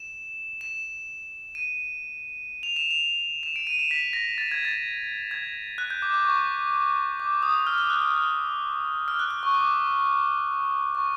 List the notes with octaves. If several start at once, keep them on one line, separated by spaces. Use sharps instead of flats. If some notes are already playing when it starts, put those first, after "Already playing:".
Already playing: E7
E7
D#7
F7
E7
F7
E7
D7
D#7
E7
B6
A#6
A6
G#6
A6
G#6
F#6
G6
D6
D6
C#6
D6
D#6
F6
F6
F#6
F6
F6
F6
F#6
F#6
C#6
D6
C#6